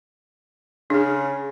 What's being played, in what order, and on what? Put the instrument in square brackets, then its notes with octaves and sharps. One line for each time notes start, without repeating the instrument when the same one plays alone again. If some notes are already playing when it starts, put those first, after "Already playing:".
[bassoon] C#3 [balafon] D4 G#4